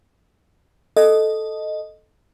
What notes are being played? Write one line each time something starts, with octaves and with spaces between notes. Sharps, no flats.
A4 D#5